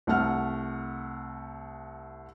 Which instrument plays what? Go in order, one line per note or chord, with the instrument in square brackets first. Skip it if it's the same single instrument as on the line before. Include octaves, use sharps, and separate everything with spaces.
[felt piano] C2 A3 F#5 F6